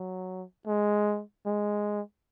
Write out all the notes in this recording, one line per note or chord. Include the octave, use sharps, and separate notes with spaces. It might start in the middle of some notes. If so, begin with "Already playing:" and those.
Already playing: F#3
G#3
G#3